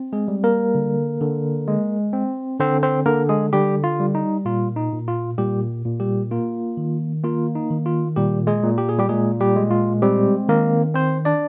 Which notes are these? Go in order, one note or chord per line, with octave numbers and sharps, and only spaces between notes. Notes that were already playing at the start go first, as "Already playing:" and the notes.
Already playing: C4
G#3 G#4
G3
A#3 A#4
D3
D3
G#3
C4
D3 C4 C5
C4 C5
D3 A#3 A#4
G#3 G#4
D3 G3 G4
F4
G3
D#4
A#2 F4
D#4
A#2
F4
A#2 G3 G4
A#2
G3 G4
A#3 F4
D#3
A#3 F4
D#4
D#3
F4
A#2 G3 G4
G#3 G#4
A#2
G4
G#4
G3 G4
A#2 G#3 G#4
G3 G4
G#3
F4
G3 C4 G4
D#3 A#3 A#4
C4 C5
D4 D5